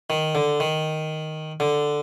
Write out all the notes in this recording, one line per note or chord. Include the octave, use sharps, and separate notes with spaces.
D#3
D3
D#3
D3